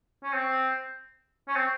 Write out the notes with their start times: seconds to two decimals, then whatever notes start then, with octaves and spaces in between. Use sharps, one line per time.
0.23 C#4
0.34 C4
1.48 C#4
1.56 C4